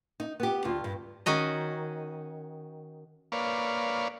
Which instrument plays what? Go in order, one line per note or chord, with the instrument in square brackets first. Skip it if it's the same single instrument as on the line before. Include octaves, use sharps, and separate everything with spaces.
[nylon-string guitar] D#4
B3 G4
D2 F4
G2
[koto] D#3 C#4 F#4 D#5
[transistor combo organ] A#3 B4 C#5 D5 F5